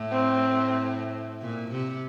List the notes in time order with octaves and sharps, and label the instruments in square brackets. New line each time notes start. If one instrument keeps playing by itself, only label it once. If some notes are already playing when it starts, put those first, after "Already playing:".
Already playing: [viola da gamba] A2
[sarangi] C4
[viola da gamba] A#2
C3